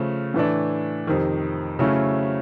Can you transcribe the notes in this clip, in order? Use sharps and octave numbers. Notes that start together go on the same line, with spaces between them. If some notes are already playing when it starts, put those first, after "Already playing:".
Already playing: C#3 F3 A3
A2 E3 A3 D4
F2 C3 D#3
C#3 F#3 A3 C#4 E4